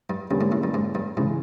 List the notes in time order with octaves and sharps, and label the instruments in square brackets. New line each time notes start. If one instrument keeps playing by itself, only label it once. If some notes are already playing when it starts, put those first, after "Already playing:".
[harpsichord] G2
[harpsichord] G2 [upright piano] D3 G3 A#3 C#4
[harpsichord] G#2
A2
G2
G#2
G2
[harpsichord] G#2 [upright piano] C#3 E3 G#3